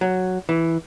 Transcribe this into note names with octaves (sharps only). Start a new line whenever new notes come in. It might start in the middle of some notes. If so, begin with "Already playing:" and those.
F#3
E3